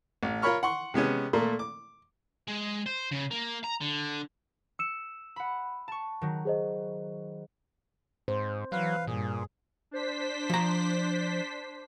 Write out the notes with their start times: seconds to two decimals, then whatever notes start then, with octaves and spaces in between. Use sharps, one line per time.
0.23 A1
0.42 F4 A#4 C#5 B5 C#6 F6
0.63 F#5 C6 C#6
0.94 C3 G#3 B3 C#4
1.33 A#2 A3 A#3
1.59 D6
2.48 G#3
2.86 C5
3.12 C#3
3.31 A#3
3.64 A#5
3.81 D3
4.79 E6 C#7 E7
5.36 F#5 B5
5.88 A5 C#6
6.21 D#3 F#3
6.45 G#4 C5 D#5
8.28 G#2 C5
8.72 E3 F#3 B4 F5
9.07 G2 A#2 G#4
9.91 D4 C5 B6
10.50 F3 A#5